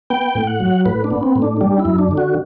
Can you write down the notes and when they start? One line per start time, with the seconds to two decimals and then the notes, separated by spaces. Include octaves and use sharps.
0.10 B3 G5
0.35 A2
0.47 F#5
0.60 F#3
0.85 A2 B4
1.04 D4
1.11 B3
1.23 C4
1.36 A2
1.42 D4
1.61 G3 D4
1.79 E4
1.85 F#2
1.98 D4
2.11 D3
2.17 F#4